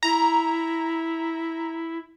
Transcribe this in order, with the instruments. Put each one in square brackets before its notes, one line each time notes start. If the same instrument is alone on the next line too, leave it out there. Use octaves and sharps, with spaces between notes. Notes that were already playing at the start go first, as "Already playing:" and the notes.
[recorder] E4 [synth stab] A#5